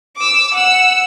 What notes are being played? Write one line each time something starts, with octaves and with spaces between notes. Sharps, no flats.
D6 E6
F#5 E6